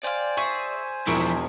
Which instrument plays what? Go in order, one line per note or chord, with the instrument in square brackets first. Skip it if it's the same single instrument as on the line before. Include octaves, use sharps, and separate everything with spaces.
[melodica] C5 G#5 [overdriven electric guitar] D5 [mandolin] F5 G5
[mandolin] G#4 E5 [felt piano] C#6
[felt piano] E1 D7 [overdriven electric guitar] F3 E4 [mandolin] C4 F#4 A#4